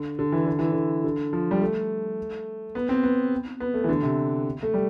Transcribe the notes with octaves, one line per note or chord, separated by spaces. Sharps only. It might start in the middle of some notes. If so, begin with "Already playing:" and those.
Already playing: D3
D3
E3
D3
E3
D3
D3
F3
G3
A3
B3
C4
B3
B3
A3
E3
D3
C3
A3
G3